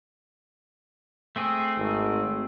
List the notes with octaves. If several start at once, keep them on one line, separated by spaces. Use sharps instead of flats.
A3 C4 G#4
G#1